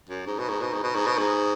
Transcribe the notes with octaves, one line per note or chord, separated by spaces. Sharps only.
F#2
G#2
B2
G#2
B2
G#2
B2
G#2
B2
G#2